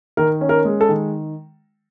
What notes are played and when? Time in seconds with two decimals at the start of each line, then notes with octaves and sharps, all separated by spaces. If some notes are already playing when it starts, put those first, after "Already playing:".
0.17 D#3 A#4
0.41 C#4
0.49 A#4
0.65 G#3
0.81 A4
0.89 D#3